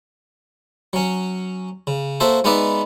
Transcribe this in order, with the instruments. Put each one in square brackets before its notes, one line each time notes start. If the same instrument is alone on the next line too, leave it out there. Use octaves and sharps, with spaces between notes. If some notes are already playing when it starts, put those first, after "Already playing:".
[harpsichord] F#3 C#4
C#3
A#3 F#4 A4 C5 E5
G#3 B3 D#4 B4 D5 E5